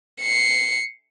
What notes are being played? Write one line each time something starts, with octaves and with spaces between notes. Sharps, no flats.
C7 C#7